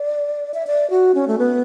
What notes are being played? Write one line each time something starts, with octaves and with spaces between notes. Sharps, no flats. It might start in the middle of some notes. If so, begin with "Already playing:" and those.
Already playing: D5
E5
D5
F#4
C#4
A3
B3